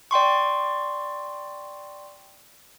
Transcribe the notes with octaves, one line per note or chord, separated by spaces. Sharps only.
D5 G5 C6 C#6